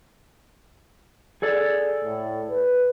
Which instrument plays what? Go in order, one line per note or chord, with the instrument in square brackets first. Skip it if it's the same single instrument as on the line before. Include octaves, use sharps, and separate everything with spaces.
[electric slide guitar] G#4 A4 D5
[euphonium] A2
B4